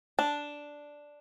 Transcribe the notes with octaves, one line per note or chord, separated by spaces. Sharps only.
D4